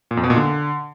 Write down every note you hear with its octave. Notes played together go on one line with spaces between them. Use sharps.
A#2
F2
B2
A#2
D3